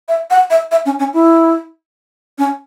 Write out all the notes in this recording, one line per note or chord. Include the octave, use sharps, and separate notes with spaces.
E5
F#5
E5
E5
C#4
C#4
E4
C#4